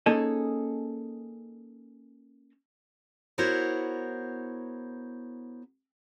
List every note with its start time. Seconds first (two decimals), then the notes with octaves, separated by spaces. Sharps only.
0.06 A#3 C#4 D#4 G#4 A4 D#5
3.38 B3 E4 F#4 A#4 C5 C#5